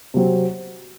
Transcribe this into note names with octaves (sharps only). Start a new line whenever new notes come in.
C3 F#3 C4